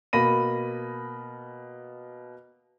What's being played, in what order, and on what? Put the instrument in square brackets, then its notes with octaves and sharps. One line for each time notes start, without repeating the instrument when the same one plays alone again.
[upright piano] B2 A#3 B5 A#6 D#7